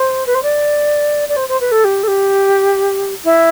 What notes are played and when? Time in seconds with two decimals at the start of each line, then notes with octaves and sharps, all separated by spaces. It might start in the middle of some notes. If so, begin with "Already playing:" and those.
Already playing: C5
0.26 B4
0.35 C5
0.43 D5
1.29 D5
1.36 C5
1.49 C5
1.60 B4
1.71 A4
1.84 G4
2.03 A4
2.07 G4
3.24 E4